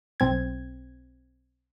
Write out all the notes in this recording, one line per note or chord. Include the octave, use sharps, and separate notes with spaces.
B1 C4 G#6